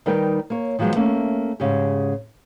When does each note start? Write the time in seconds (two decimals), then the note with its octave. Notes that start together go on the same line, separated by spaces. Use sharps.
0.06 D#3 G3 D#4 A#4 B4 G5
0.50 A#3 C#5
0.79 D#3 F3 F#3 G#3 B3
0.95 A3 A#3 C#4
1.60 G#2 C#3 G4